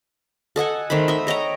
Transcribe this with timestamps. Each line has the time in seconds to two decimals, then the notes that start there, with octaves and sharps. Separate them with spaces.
0.56 A4 D#5 F#5 G#5
0.90 D#3 A3 C5 B5
1.08 D#5 E5
1.27 C#5 D#5 G5 A#5